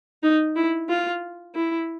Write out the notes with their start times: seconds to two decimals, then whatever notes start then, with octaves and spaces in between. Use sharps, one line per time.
0.23 D#4
0.56 E4
0.89 F4
1.55 E4